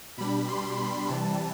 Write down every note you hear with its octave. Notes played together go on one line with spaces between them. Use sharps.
B2 G3 D4 B5
C6
B5
C3 E3 G3 A5